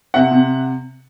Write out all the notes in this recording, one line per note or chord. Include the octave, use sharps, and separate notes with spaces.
C3 E5 F#5
C3